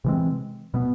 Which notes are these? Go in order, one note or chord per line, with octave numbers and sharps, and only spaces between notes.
C3 E3 G#3 C4
B2 G#3 B3